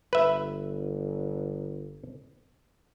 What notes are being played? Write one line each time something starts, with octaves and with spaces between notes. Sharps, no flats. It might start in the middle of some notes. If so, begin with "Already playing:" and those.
G1 B4 E5